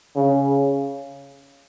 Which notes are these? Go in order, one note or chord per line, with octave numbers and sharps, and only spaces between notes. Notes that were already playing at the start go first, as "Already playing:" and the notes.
C#3